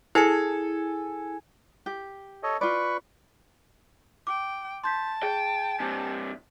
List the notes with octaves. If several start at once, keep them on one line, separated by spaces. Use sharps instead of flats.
E4 G#4 A4 G#5 C7 C#7
G4
A4 C#5 D#5
F4 B4 D5 B5 C#6
G5 D6
A5 C6 G6 B6
G#4 G5
G2 C3 G#5